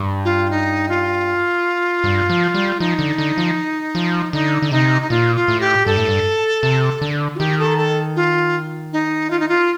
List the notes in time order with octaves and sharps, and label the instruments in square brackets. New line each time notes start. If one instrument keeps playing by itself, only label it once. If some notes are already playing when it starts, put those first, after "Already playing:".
Already playing: [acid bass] G2
[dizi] F4
D#4
F4
[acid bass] G2
F3
G3
[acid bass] F3 [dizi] D#4
[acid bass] D3
D3
F3
F3
[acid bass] D3 [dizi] D#4
[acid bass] D3
[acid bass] C3 [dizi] D#4
[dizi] D#4
[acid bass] A#2 [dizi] F4
[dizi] F4
[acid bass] A2
[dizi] G4
[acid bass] G2 [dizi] A4
[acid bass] A2
G2
C3
D3
[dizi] F4
[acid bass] D#3 [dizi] G4
[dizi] A4
A4
F4
D#4
F4
D#4
F4